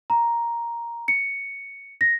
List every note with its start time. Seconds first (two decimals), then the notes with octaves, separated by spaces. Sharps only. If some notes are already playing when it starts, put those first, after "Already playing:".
0.10 A#5
1.08 C#7
2.01 A#6